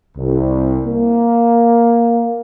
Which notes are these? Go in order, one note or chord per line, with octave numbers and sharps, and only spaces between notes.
C2
A#3